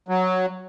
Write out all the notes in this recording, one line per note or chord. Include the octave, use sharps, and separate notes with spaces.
F#3